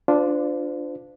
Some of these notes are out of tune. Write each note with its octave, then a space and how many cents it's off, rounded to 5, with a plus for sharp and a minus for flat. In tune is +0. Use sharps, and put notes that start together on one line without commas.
D4 +0 F4 +0 C5 -40